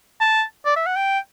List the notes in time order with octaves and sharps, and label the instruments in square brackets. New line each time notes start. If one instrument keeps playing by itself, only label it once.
[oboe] A5
D5
E5
F#5
G5